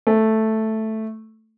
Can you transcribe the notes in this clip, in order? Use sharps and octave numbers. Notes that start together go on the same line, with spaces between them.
A3